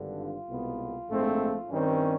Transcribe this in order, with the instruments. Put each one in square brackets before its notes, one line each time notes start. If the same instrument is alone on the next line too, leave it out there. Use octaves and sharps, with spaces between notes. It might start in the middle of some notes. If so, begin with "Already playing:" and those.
Already playing: [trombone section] G#1 G2 D3
F4
C2 B2 G#3 B3
A#1 G#2 F3 A3 C4
G2 D#3 G3 C4 C#4